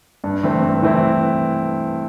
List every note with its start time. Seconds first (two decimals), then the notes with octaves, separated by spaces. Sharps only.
0.24 G2
0.43 E3 A3 C4 E4
0.63 G2
0.82 E3 A3 C4 E4